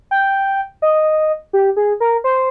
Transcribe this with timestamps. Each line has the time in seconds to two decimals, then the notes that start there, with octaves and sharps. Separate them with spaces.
0.11 G5
0.82 D#5
1.53 G4
1.77 G#4
2.00 A#4
2.24 C5